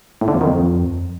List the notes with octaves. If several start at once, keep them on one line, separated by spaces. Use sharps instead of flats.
A2
D3
F2
D#3
F2